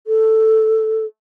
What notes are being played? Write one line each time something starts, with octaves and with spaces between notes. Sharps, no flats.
A4